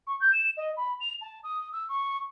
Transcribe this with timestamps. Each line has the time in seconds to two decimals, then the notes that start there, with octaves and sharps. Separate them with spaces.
0.07 C#6
0.20 G6
0.32 E7
0.57 D#5
0.76 B5
1.00 F7
1.21 A5
1.43 D#6
1.72 E6
1.89 C#6